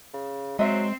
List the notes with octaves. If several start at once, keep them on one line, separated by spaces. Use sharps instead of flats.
C#3
F#3 G#3 C4 C5 D#5 E5